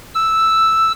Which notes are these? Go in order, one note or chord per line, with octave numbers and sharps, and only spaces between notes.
E6